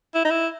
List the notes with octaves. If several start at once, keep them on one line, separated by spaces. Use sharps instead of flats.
E4
D#4
E4